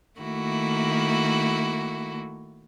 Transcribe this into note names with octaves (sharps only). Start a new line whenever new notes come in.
D#3 A3 A#3 E4 F#4